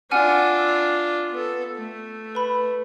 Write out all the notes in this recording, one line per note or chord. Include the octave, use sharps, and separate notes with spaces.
D4 F4 F#5 G#5 F6
E6
B3 A4
A3
B4 B5